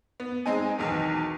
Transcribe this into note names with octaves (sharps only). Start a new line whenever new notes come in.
B3
G#3 C4 D#4 G#5
B1 E2 D#3 B3